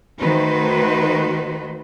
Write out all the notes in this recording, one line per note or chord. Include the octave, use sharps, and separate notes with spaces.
D#3 A3 F#4 B4 C5